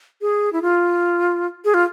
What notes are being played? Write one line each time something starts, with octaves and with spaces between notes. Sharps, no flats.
G#4
E4
F4
G#4
F4